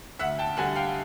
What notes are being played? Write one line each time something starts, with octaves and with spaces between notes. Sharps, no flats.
D2 E5 F#5
G5 A5
D3 G3 F#5 G#5
F5 G5